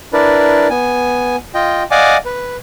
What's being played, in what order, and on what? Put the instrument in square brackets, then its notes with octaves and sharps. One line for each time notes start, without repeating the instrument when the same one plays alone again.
[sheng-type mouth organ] D4 E4 A#4 B4 D5
B3 G#5
F4 D#5 G5
D5 D#5 F5 F#5 G#5 D6
B4